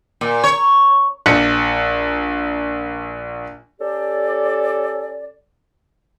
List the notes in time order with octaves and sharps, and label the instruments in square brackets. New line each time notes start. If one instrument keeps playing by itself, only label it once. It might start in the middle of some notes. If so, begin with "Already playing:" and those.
[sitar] A#2
C#5
[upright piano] A#1 C#7
[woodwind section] C#4 G4 A4 D5